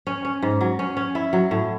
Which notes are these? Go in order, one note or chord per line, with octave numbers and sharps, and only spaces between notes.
C#4
C#4
G#2
F#3
C#4
C#4
E4
F#3
A2